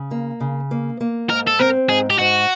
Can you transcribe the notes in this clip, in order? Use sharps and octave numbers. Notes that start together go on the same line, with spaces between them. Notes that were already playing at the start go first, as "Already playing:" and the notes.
Already playing: C#3
A#3
C#3
A#3
A#3
G#2 A#4
A4
C4 A#4
G#2 G#4
G4
G#2 F#4